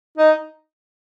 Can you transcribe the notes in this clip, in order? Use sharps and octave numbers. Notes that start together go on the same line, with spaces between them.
D#4